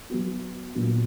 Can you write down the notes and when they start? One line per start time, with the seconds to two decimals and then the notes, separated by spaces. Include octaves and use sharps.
0.10 F#3 B3 F#4
0.75 A#2 F#3 B3